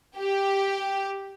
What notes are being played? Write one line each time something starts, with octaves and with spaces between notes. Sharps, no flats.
G4